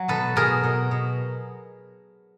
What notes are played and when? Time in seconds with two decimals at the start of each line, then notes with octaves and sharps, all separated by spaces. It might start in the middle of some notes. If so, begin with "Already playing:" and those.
Already playing: F#3
0.08 B2 A4 B4
0.36 B2 G#4 A#4
0.63 B2
0.91 B2